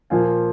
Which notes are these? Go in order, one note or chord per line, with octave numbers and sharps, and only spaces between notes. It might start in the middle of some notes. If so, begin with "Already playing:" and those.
A#2 F3 A#3 F5 G#5